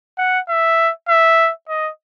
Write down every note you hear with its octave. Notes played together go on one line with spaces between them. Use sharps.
F#5
E5
E5
D#5